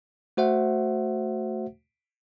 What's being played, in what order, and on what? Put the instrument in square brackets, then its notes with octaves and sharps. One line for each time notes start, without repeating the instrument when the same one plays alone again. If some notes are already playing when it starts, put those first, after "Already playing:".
[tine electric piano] A3 F#4 C5 E5 F#5